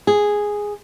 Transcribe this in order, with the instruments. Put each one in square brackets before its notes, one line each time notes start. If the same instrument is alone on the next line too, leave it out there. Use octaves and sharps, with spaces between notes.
[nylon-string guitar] G#4